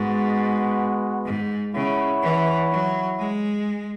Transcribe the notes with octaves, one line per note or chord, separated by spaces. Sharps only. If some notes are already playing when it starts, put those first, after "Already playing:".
Already playing: G#2 G#3 B3 F#4
G#2
C#3 E4 C#5 F#5
E3
F#3
G#3